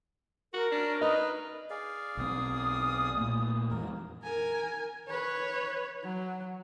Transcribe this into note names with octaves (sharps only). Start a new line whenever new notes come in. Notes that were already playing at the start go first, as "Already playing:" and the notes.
F#4 A#4
C#4 D4
D#4 B4 D#5
G#4 D5 F5
B1 F3 C4 D#6
A#2 A3
F2 E3 G#3 A#4
A#4 G#5
B4 C#5
F#3